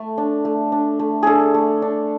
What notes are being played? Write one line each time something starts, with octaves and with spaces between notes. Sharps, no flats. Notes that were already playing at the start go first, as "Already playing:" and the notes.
Already playing: A3
D4
A3
D4
A3
D4 G#4 A4
A3
D4